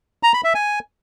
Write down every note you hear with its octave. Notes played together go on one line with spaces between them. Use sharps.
A#5
B5
E5
G#5